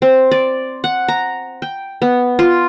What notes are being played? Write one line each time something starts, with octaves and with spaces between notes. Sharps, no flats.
C4
D5
F#5
A#5
G5
B3
F4